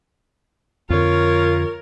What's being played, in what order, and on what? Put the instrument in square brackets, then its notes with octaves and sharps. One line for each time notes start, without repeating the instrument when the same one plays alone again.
[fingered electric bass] F2 D3 [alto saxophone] F4 [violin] A#4 [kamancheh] C#5